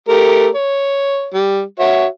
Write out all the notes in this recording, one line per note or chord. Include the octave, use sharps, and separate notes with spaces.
A3 G4 A#4
C#5
G3
F#4 C#5 E5